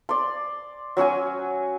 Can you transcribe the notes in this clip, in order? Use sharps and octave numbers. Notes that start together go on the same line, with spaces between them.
D5 C6
F#3 C#4 F#4 G#5